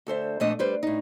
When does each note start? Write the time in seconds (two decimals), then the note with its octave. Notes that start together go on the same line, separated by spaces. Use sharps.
0.07 D2 A4 C5 E5
0.40 F2 A#2 A3 D4 D#5
0.59 G3 B4 C5
0.83 A2 D#4